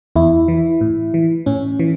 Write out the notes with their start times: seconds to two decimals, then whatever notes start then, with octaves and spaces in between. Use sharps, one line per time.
0.16 E2 E4
0.48 E3
0.81 A2
1.14 E3
1.46 A2 C#4
1.79 E3